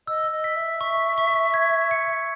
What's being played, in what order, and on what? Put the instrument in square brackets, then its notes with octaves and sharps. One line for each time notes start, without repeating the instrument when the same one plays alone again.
[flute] D#5 [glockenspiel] E6
[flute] D#5
[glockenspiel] B6
[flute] E5
[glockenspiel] C#6
C#6
G#6
C#7